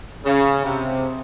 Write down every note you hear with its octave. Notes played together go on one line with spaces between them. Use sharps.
C#3
C3